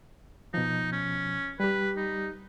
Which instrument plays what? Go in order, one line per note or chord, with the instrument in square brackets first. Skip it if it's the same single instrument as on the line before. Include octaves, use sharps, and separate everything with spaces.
[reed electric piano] B2 F3 [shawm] D#4
[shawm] C#4
[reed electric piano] G3 G4 [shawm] B4
[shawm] D#4